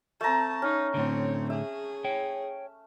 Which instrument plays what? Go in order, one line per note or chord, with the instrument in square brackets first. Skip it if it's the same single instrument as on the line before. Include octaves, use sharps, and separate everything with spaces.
[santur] A3 A#5 [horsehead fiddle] C4 A5
[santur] C#4 [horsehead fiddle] D#4
[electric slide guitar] A2 D3 [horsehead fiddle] C4 C#5
[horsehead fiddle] G#4 [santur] E5
[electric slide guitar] C#5 G5